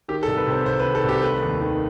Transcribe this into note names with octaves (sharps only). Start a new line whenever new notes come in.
D#3 G4
A4
C2
B4
C3
C5
C2 C5
B4
D#3
A4
C2 G4
A3 B4
D#2
D#3